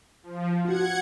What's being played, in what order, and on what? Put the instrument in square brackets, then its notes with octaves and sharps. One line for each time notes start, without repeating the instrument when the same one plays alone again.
[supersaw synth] F3
[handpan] F4 F#4 [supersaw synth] F#5 G#6 C#7